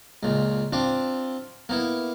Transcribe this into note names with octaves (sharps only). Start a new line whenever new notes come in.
C#2 A#2
C4 D4 F4
A#3 B3 E4